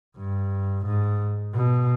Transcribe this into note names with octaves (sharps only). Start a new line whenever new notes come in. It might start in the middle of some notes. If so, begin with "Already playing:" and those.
G2
G#2
B2